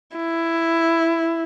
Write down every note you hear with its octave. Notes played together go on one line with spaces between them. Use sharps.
E4